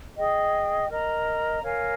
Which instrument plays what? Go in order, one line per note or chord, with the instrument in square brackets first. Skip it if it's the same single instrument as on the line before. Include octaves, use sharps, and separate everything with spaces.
[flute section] G#4 D#5 G5
A#4 D#5 A#5
A#4 C#5 F5 G#5